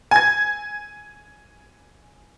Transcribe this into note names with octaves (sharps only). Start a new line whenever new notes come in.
G#5 G#6